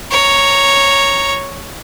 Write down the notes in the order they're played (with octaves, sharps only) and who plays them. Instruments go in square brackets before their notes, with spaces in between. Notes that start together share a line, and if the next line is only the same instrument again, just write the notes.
[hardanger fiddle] C#5 A#5